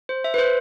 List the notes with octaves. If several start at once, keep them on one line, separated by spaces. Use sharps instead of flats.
C5
E5
B4
C5